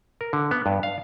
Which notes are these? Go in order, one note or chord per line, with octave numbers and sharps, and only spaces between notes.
A#4
D3
B3
G2
F5